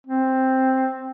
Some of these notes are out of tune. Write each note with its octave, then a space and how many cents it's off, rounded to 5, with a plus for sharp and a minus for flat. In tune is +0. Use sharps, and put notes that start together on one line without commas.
C4 +5